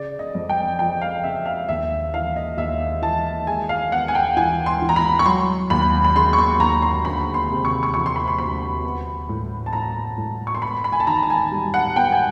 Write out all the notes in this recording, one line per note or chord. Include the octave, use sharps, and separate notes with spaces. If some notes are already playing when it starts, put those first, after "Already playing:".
Already playing: C#3 D5
D#5
F2
G5
F3 G5
F5
C#3 E5
F5
D#2 E5
E3 F5
D#5
D#2 E5
E3 A5
G#3 G#5
F5
B3 F#5
G#5
G5
E3 G#5
C6
E3
A#5
B5
C#6
F#3 C6
D#2 B5
B5
C#3 C6
C#6
C6
D#2 A#5
C6
D2 B5
C6
C3
C#6
C#6
F3 C#6
C6
B5
C6
D2 B5
B3
A2
A5
A2 A#5
A2
C#6
C6
B3 B5
B5
G#5
A5
D#3 A#5
A5
G#5
G3
F#5
B3 G5
G#5